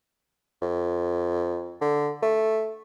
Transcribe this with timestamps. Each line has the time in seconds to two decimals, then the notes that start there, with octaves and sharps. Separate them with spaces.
0.62 F2
1.81 D3
2.22 A3